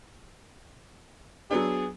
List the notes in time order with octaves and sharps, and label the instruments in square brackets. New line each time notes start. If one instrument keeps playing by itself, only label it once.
[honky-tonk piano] F#3 B3 D4 [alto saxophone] G#4